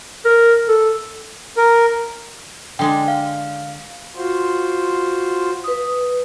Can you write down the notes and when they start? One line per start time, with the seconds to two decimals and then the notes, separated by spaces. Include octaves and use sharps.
0.25 A#4
0.68 A4
1.57 A#4
2.79 D3 G#3 D4 G5
3.08 F5
4.16 F4 F#4 C5
5.64 B4 D#6